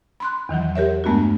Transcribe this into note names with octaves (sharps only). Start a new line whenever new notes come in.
B5 C6 F#6
E2 D#3 E3 F#3
G4 A#4 C#5 E5
G2 G#3 A3 B3 D4 F#4